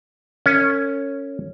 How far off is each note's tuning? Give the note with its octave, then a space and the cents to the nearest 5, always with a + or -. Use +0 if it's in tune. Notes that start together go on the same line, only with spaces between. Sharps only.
C#4 +0 A#4 -45